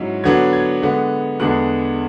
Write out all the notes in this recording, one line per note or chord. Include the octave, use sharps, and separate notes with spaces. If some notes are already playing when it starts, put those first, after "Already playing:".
Already playing: G#2 F#3 C#4 E4
D3 F#3 B3 D4 G#6
G#6
D3 G#3 B3
E2 D3 G#3 B3 D4 F#6